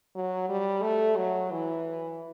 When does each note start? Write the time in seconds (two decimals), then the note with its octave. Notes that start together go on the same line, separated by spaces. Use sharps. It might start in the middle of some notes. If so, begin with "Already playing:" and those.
0.15 F#3
0.49 G3
0.82 A3
1.16 F#3
1.51 E3